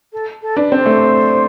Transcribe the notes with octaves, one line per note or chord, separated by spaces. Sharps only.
A4
A4
D4 B4
C4
C5
A3